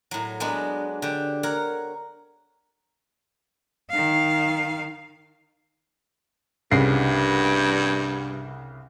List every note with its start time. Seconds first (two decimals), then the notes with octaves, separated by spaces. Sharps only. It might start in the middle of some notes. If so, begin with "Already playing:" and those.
0.11 A2 F#3
0.40 F#3 G#3 B3 D4
1.02 D3 G4
1.43 A#4 C#5 F#5
3.90 D#3 F5
6.71 C2 G2 C#3 C7